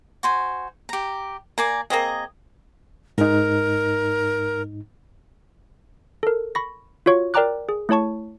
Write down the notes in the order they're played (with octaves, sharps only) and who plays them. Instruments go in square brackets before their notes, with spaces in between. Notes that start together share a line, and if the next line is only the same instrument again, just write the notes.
[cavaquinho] F#4 C5 G#5
G4 A#5
[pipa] A#3 [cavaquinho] D5 G#5 A#5
[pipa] A#3 C4 G#4 [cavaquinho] D#5 A#5
[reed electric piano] G#2 D#4 [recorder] A#4
[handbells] A4 A#4
B5 C#6 A#6
F4 F#4 C#5 C#6
A#4 D5 G5 A#5 D6 F#6
G#4
A3 E4 C#5 A5 C#6